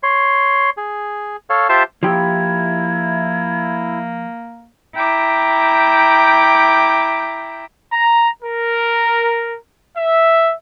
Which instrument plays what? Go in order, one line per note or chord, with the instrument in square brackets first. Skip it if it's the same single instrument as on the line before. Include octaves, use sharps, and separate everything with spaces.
[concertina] C#5 C6
G#4
A4 C#5 F5
F4 G4 C5 E5 A5 C6
[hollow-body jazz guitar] F3 G4 [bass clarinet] A#3 [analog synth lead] E4 [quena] G#6
[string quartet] E4 G5 A#5 D6
[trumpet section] A#5
A#4
E5